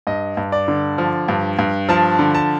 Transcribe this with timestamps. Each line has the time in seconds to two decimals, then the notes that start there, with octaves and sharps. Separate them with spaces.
0.07 G2 D#5
0.37 G2
0.52 D5
0.68 D3
0.98 F3
1.28 G2
1.59 G2
1.89 F3 A5
2.19 D3
2.35 A5